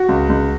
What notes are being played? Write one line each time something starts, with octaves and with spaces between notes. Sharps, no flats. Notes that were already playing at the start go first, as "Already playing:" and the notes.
Already playing: F#4
C#2
C#2